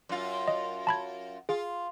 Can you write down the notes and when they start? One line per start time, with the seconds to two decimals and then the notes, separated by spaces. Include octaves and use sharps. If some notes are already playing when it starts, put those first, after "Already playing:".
0.09 F#2 F4
0.48 D#5
0.87 A5 B5 G#6
1.49 F4 G#4